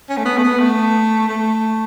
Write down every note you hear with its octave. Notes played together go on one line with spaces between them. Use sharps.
C#4
A3
B3
A3
B3
A3
A3